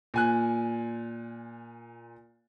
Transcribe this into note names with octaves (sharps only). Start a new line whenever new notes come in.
A#2 G#5 F#6